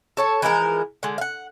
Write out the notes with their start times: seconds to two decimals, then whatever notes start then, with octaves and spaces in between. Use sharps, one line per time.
0.17 A4 C#5 A5
0.42 E3 F3 G#3 A#4
1.03 D3 G#3
1.18 F5 F#5